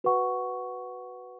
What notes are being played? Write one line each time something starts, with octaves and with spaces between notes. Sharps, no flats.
F#4 B4 F#5 C#6